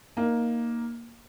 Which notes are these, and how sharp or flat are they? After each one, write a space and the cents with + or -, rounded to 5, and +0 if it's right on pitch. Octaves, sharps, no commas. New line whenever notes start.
A#3 +5 D#4 +0